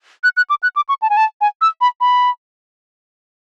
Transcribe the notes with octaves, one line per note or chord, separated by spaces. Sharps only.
F#6
F#6
D6
F#6
D6
C#6
A5
G#5
A5
G#5
E6
B5
B5